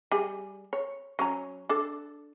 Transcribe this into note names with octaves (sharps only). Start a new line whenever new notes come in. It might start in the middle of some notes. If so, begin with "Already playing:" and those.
G3 G#4
C#5
F#3 C#4 A#5
D4 A4